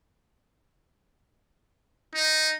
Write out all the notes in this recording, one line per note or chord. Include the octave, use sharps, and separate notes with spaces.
D#4